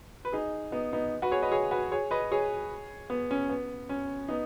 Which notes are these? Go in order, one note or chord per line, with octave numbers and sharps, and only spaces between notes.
B4
D#4 G#4
B3 D#4
B3 D#4
F#4 B4
G#4 C#5
B4 D#5
G#4 C#5
F#4 B4
G#4 C#5
B4 D#5
G#4 C#5
B3
C#4
B3
C#4
B3 D#4